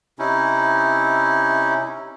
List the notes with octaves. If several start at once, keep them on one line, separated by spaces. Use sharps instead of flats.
C3 C#4 D#4 E4